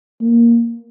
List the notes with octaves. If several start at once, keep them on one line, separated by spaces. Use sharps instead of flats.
A#3